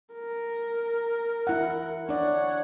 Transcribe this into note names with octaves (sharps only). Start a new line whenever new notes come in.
A#4
E4 F#5
D4 C#5 D5 F#5